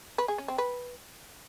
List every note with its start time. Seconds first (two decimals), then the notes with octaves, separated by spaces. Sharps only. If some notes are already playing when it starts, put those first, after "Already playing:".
0.18 B4
0.28 G#4
0.38 C#4
0.48 C4
0.58 B4